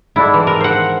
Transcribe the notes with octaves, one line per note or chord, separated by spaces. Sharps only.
G#2 D4 E4 A4
E3 C4
A#4
C5 F#5